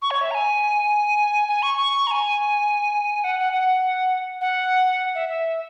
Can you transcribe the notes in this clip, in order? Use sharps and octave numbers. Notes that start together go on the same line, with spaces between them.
C#6
C#5
E5
A#5
G#5
G#5
C#6
C#6
A#5
G#5
F#5
F#5
F#5
F#5
E5
E5